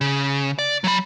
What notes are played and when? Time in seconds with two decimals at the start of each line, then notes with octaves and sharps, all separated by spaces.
0.01 C#3
0.59 D5
0.84 F#3 B5